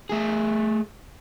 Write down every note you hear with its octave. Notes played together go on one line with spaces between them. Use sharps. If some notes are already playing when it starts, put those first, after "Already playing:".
A3 G#4